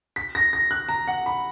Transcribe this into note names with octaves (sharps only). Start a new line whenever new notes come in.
B6
A#6
A#6
F#6
A#5
F#5
B5